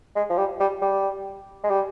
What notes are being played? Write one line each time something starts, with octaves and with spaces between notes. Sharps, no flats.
G#3
F3
G3
G3
G3
G#3
G3